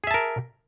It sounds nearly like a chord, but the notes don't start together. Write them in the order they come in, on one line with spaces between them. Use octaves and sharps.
G#4 E5 A5 A#4